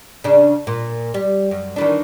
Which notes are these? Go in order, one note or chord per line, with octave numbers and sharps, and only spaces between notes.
C#3 D4
A#2
G3
F#2
D#3 E3 D4